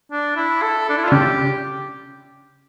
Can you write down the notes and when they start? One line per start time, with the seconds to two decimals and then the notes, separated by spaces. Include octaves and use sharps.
0.12 D4
0.37 E4
0.62 A4
0.90 D4
0.97 E4
1.04 F4
1.08 D4
1.12 C#3 C#4 G4